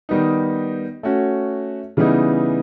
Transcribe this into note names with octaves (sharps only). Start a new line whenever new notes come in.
D#3 G3 B3 D#4
A3 C#4 F#4
C#3 E3 G3 B3 D#4